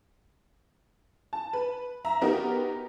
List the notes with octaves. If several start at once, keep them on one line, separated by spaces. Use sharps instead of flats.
A5
B4
E5 A#5
B3 D#4 F#4 G4 A#4